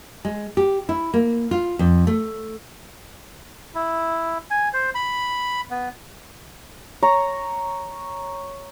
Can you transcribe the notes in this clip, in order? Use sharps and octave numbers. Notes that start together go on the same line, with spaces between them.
G#3
G4
E4
A#3
F4
F2
A3
E4
G#5
C5
B5
B3
C#5 A#5